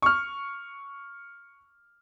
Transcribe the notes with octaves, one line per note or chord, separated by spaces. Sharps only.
C#6 F6